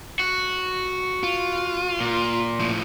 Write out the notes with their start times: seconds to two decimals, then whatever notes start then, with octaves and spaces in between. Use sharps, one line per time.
0.19 F#4
1.23 F4
2.01 A#2
2.60 A2 F3